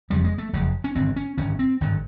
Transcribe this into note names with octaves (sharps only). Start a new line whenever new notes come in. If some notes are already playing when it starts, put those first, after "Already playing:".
F#1 F2 C#3 G3
G#3
A3
F#1 F2 C#3
C#4
G#1 G2 D3 C4
C#4
G#1 G2 D3 C#4
C4
G#1 G2 D3